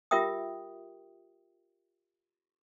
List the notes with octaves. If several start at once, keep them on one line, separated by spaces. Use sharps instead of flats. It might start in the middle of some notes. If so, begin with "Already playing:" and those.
F4 G4 A#4 E5 G5 D#6